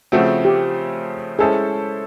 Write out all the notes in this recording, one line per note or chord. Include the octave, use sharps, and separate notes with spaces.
C#3 F3 A3 C4 F#4
G4
G#3 C#4 E4 G#4 A4 C5